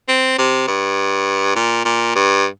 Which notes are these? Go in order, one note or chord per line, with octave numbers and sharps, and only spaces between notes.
C4
C3
G2
A#2
A#2
G2